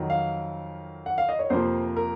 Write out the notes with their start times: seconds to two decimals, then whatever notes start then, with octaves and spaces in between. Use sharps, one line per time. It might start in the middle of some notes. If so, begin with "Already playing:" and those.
Already playing: F2 D#3 F#3
0.10 F5
1.06 F#5
1.18 F5
1.29 D#5
1.39 C#5
1.50 F2 C3 F3 A#3 C5
1.96 A#4